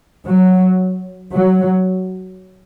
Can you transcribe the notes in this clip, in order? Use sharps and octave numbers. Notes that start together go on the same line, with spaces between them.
F#3
F#3